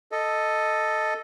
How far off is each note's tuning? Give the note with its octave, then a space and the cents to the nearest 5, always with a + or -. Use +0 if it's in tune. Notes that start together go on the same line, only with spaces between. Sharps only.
A4 +0 D#5 +0